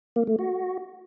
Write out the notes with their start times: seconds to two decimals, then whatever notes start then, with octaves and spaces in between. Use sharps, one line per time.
0.16 A#3
0.27 A3
0.39 F#4